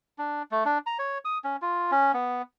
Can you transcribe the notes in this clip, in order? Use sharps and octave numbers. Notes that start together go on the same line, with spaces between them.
D4
A3
D4
A#5
C#5
D#6
C#4
F4
C#4
B3